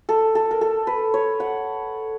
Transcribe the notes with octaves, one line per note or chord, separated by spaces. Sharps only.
A4
A4
A#4
A4
B4
C#5
F#5